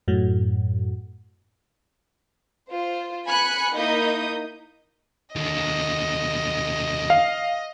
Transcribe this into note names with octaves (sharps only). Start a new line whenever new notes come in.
F#2 A2 F#3
F4 C5
G#5 B5 F#6 C#7
A#3 D#4 E4 D#6 G6
D#2 D3 D#5
F5